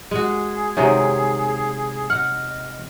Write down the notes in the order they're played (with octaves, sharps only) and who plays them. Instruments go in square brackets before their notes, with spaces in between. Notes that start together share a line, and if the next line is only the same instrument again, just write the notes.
[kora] G#3 F#4 [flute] G#4
[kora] C3 D#3 G#3 [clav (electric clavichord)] C#4 F#4 C#5
[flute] D#5 [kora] F#5 [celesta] F6